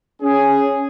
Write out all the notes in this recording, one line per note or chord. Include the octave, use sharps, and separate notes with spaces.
C#4 G#4